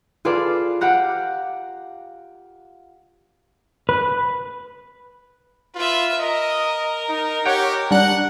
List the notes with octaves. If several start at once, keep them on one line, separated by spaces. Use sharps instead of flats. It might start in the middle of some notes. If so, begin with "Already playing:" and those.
F4 G#4 A4 B4 D5 F5
G4 F5 F#5 A#5
B4
F4 B4 E5
A#4 D#5
D#4
G4 C#5 F#5 G5
G3 D4 F#5 F#6